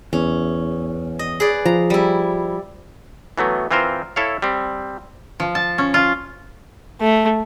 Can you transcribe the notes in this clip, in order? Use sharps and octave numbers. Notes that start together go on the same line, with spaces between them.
E2 C#4
D#5
G#4 B4 D5
F3 A#5
G3 E4
E3 F#3 A3 B3
E3 C4 F4 A#4 C5
E4 A4 C#5 F5
G3 C4
F3
A5
C#4
F4
A3